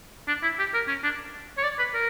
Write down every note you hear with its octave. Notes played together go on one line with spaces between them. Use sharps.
D4
E4
G4
A#4
C#4
D4
C#5
D5
B4
A#4